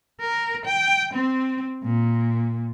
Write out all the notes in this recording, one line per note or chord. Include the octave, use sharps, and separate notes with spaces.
A#4
G5
C4
A#2